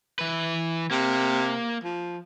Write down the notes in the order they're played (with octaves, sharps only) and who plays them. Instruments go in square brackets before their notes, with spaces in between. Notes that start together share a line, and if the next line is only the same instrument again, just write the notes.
[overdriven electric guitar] E3 B4
[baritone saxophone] C3 [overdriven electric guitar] A#3
[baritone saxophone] F3